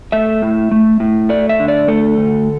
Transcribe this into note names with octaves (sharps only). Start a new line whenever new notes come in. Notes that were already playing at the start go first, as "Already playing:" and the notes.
A3 E5
A2
A3
A2
A3 D5
E5
D3
D5
A3 A4
D3